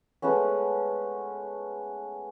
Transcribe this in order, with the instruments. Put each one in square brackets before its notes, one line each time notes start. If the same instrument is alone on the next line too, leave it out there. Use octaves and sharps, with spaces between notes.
[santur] G#3 A3 B3 C#4